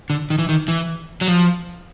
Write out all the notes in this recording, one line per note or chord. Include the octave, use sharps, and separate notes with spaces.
D3
D#3
E3
D#3
E3
F#3
F3